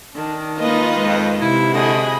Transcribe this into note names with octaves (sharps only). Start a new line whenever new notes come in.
D#3 D4
A#3 D#4 F4 B4 D#5
F2 G#3
C3 E4
D3 F#4 G#4 D#5 B5